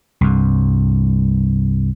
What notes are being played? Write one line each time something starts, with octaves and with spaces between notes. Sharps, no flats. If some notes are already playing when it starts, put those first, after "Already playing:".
C2 G2